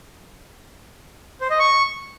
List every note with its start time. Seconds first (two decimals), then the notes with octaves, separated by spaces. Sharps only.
1.41 C5
1.50 D#5
1.59 C#6